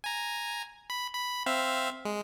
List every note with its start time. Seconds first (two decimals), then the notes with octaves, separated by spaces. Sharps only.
0.04 G#5 A#5
0.90 B5
1.15 B5
1.46 C4 E5 F5
2.05 G#3